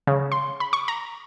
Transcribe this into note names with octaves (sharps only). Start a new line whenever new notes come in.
C#3
C6
B5
C#6
A#5